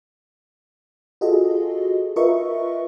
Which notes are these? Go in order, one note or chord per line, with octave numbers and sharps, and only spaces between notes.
F4 F#4 G#4 A4 D#5
F4 A#4 B4 D#5 E5 C#6